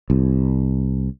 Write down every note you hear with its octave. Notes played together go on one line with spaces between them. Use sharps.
C2